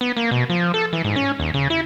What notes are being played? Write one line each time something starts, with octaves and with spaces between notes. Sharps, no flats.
B3
A#3
B2
F3
A4
E3
G#2
C#4
D#2
C#3
E4